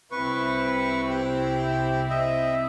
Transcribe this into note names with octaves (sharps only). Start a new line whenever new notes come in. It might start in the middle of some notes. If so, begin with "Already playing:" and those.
C2 C4 E4 B4 C#6
G4
D#5 E5